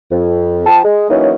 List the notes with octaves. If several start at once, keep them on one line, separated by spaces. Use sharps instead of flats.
F2
F3 G5 A5
G#3
E3 F#3 A#3 C#4 D#4